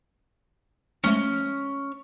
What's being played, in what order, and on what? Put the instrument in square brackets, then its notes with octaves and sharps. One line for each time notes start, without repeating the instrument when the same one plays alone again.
[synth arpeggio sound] F3 G#3 A3 [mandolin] C#4